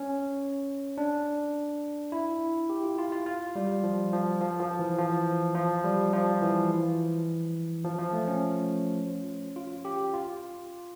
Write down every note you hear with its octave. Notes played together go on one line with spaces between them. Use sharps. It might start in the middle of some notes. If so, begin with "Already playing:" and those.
Already playing: C#4
D4
E4
G4
F4
F4
F4
F4
G3
F3
F3
F3
F3
E3
F3
F3
G3
F3
E3
F3
F3
A3
C#4
F4
G4
F4